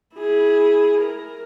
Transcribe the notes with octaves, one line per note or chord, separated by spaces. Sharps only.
E4 G#4
A#4